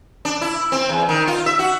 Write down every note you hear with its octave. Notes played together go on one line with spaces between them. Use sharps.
D4
E4
C4
E2
D#3
F4
E5
F#4